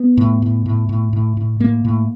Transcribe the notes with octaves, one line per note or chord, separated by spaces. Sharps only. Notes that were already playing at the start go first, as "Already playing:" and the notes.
Already playing: B3
A2
A2
A2
A2
A2
A2
A2 A#3
A2